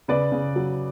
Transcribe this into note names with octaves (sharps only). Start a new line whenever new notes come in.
C#3 B4 D5
C#3
F#3